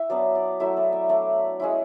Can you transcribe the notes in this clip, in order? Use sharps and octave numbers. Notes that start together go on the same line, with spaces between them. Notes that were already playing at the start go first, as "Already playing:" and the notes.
Already playing: E4 E5
F#3 B3 D4 D5
D5
F#3 A3 E4 E5
D5
E5
A3 D4 D5
G#3 C#4 E4